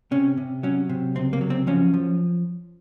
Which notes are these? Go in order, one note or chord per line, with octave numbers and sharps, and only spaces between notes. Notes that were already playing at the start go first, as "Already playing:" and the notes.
C3 C#4
C3
F#3 C#4
C3
C#2 C4
A#3
F#3
C4
F3 C#4
F3